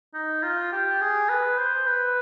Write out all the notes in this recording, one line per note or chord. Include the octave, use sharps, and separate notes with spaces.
D#4
F4
G4
G#4
B4
C5
B4